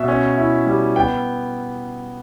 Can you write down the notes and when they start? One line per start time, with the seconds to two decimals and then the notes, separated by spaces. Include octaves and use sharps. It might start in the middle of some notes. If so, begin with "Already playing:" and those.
Already playing: B2 E5
0.08 C#4
0.38 E4
0.67 G3
0.96 B3 G5